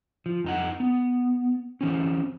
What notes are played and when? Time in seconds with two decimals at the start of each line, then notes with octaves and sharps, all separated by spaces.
0.26 F3
0.44 F2 D#4 F#5
0.80 B3
1.81 E3 C4 C#4